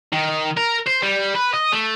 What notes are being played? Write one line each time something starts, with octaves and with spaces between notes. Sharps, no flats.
D#3
A#4
C5
G3
B4
D#5
A3